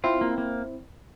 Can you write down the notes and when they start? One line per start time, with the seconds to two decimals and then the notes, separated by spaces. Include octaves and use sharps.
0.04 C4 E4 F4
0.21 A#3
0.38 A#3